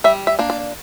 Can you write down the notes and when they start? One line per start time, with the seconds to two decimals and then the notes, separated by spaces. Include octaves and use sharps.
0.04 G3 E5
0.27 E5
0.39 A#3 D4
0.50 D5